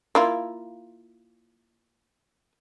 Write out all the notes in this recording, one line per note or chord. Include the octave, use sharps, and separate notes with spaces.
A#3 E4 F4